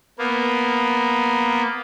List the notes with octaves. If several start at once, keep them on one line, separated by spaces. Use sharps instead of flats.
A#3 B3